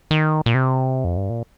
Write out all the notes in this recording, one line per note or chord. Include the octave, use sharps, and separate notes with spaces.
D#3
A#2
C3
F2
G2
A#2